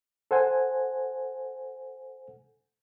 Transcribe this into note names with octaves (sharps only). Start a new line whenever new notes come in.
A4 C5 F#5 G#5